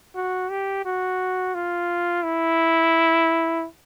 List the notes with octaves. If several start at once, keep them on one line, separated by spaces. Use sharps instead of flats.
F#4
G4
F#4
F4
E4